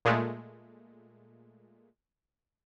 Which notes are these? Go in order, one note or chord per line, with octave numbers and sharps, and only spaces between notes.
A#2 G#3 A3